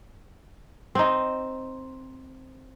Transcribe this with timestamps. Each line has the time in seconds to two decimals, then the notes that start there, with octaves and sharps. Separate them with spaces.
0.95 C4 D#4